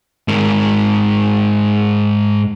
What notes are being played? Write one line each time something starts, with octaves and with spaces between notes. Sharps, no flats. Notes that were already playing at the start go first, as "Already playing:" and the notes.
G#2 A#4